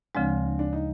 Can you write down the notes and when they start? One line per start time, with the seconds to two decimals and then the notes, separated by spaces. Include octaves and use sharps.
0.15 D2 C#3 F3 G#3 C4 D4
0.59 D4
0.73 D#4